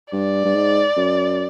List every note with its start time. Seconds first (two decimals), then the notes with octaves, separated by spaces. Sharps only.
0.12 G2 D5
0.45 G2
0.55 G#2
0.96 F#2